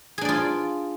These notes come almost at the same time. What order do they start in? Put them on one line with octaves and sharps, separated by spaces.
G#4 D4 D5 F4